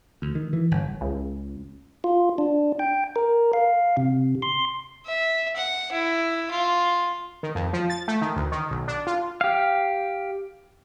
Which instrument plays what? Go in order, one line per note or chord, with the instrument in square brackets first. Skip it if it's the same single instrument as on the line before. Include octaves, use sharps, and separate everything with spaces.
[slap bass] D2
D#3
E3
G1
[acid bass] C#2
[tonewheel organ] F4
D4
G5
A#4
F5
C3
C6
[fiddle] E5
F#5
E4
F4
[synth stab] D#3
F2
F3
A6
A3
D#3
D2
D#3
B1
D4
F4
[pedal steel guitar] G4 F5